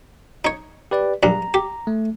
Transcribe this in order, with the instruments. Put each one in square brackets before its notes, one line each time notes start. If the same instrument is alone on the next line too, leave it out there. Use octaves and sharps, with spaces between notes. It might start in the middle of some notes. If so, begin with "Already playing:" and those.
[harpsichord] D#4 C#5
[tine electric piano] G4 B4 D5
[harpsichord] A#1 G2 [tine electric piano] A#5
[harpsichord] G4
[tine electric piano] A3